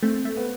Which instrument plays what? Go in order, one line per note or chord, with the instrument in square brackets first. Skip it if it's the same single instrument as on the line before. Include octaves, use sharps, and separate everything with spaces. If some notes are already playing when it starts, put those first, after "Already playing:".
[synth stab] A3 [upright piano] C4
[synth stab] A3
[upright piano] B3